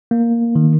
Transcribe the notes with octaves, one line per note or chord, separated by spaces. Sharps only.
A#3
D#3